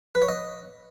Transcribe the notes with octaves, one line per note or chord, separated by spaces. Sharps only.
B4
C#5
D#5